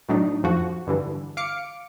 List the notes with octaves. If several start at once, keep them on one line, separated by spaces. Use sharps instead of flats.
A2 F#3 D4 D#4
F2 F3 F#4
G2 D3 E3
F5 D6 C#7